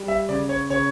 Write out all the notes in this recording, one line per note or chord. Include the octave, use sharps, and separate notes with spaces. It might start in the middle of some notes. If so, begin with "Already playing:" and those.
Already playing: G3
E5
C#3 D5
C#5
C#3 C#5